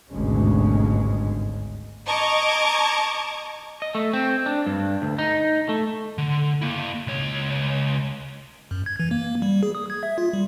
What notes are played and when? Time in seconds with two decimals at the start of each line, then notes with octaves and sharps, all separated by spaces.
0.12 G#1 D2 G2 B2 G#3 C#4
2.06 D#5 A5 A#5 C#6 D6 G#6
3.82 D#5
3.95 A3
4.13 C4
4.46 D4
4.67 G2
5.02 D2
5.19 D#4
5.69 A3
6.18 D3
6.62 A#3 E4
7.07 C#2 C#5
8.71 F#2
8.86 G#6
9.00 E3
9.11 A#3
9.42 G3
9.63 G#4
9.75 D#6
9.90 G#6
10.03 E5
10.18 F4
10.33 G3